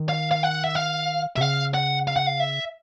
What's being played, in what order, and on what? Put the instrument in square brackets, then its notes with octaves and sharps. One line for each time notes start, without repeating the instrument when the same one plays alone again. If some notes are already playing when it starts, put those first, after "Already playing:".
Already playing: [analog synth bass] D#3
[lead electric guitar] F5
F5
F#5
E5
F5
[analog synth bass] C3 [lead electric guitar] E5
[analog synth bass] C#3 [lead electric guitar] F5
[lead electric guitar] F#5
F5
F#5
F5
E5